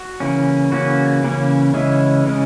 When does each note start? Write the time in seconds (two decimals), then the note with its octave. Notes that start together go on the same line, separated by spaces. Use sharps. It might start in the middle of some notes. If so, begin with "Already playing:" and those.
Already playing: F#4
0.20 C#3 E3 A#3 C#4
0.72 C#3 E3 A#3 C#4 F#4
1.23 C#3 E3 A#3 C#4
1.74 C#3 E3 G#3 C#4 E4
2.26 C#3 E3 G#3 C#4